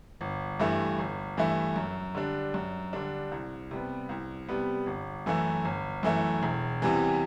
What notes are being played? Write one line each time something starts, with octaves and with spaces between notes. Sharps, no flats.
G1
G2 E3 A3 E4
G1
G2 E3 A3 E4
F#2
D3 G3 D4
F#2
D3 G3 D4
C2
C3 G3 B3
C2
C3 G3 B3
G1
F#2 E3 A3 E4
G1
F#2 E3 A3 E4
E1
E2 C3 E3 G3